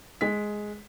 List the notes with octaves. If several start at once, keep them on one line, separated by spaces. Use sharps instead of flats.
G#3 B6